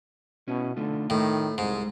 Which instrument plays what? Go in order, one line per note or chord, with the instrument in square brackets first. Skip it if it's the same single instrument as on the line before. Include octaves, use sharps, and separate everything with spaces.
[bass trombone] B2 [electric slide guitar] C#4 E4
[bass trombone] D3 [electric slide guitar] A3 D#4 F4
[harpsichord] A2 [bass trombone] D#3
[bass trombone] C2 [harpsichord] G#2 [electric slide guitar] G#3 C5